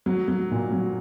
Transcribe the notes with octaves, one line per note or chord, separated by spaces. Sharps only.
F#3
F#3
A#2
F#3